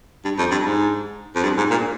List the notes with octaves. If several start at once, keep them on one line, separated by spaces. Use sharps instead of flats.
G2
F2
G2
G#2
F2
G2
G#2
A#2